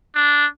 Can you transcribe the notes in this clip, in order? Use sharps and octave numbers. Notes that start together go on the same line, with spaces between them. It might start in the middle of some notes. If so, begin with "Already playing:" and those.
D4